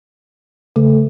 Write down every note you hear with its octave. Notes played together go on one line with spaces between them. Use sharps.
C#3 A3